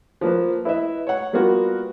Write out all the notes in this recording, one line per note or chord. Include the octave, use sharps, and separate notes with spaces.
F3 A#3 B4
E4 B4 D#5 E5
C#5 F#5
G3 A#3 B3 F4 F#4 A#4